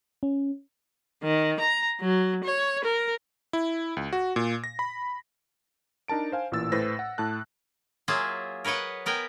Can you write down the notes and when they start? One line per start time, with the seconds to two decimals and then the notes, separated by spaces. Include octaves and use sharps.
0.23 C#4
1.23 D#3
1.60 A#5
2.01 F#3
2.44 C#5
2.84 A#4
3.53 E4
3.97 C#2
4.13 F#4
4.36 A#2
4.64 A#6
4.79 B5
6.08 D4 D#4 A#4 A5 D7
6.32 C5 F5 G#5
6.51 A1 A#2 E3 E6 A6
6.72 A2 B4 C5 E6 A#6
6.99 F#5
7.18 A2 A5 F#6
8.08 F#3 A#3 F4 G#4 E5
8.65 A#4 B4 C#5 D#5 F#5
9.06 B3 A#4 B4 G5 G#5